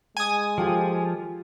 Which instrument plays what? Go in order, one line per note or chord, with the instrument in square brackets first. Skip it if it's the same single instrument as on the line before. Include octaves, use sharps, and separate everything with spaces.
[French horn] G#3 [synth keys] G#5 D#6
[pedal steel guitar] F3 [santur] F4 G4 A4